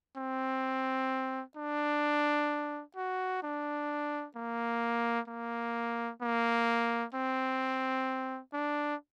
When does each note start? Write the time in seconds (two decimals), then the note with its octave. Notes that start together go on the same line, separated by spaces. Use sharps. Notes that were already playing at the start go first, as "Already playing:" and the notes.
0.17 C4
1.57 D4
2.96 F#4
3.43 D4
4.36 A#3
5.28 A#3
6.22 A#3
7.15 C4
8.54 D4